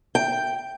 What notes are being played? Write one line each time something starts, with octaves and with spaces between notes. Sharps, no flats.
G5